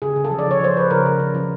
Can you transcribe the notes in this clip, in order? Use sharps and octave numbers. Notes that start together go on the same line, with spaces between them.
C#3 G#4
C#3
A4
F3
D5
F3 C#5
F3 C5
F3 B4
C#3 A#4
C#3
C#3
F3